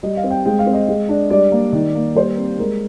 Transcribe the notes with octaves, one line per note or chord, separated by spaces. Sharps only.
G3 D#5
F5
C4
G5
G#3 G5
F5
C4
D#5
G#3
D4
G3 D5
A#3
D#3
A#3
G3 C5
C4
G#3 A#4